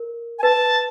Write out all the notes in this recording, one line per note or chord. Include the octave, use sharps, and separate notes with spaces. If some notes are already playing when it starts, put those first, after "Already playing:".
Already playing: A#4
G#5
B4 A5